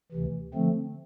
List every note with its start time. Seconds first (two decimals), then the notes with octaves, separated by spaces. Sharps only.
0.12 D2 C3 E3
0.54 D3 F3 A3 C4